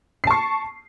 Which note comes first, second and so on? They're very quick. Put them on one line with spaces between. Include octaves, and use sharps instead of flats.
C7 A5 C#6